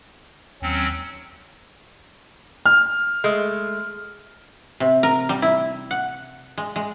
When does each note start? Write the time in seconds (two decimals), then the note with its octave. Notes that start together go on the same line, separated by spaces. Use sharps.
0.62 D#2 F#3 C4 C#4
2.66 F6
3.24 G#3 A3
4.80 C3
5.03 A#4
5.29 G3
5.42 E4
5.91 F#5
6.58 G#3
6.76 G#3